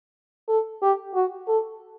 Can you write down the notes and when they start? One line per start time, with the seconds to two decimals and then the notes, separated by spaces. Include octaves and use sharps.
0.49 A4
0.82 G4
1.14 F#4
1.48 A4